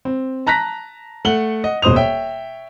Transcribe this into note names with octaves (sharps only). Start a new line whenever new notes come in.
C4
A5 A#5 F#6 A#6 B6
A3 F#5 F#7 G7
D#5 F#5
D#1 B2 C5 D#6 F7
C#5 E5 G5